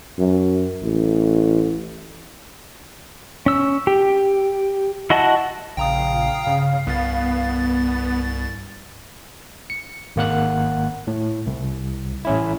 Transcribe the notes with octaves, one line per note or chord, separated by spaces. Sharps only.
F#2
A1
C#4 E6
G4
E4 F#4 D#5 F#5 A5
A#1 C#3 F5 G5 A#5 D#6
G2 C#3
C2 B3 A6
C#7
G#1 A#3 F#5 F#6
A2
C2
A1 C#4 E4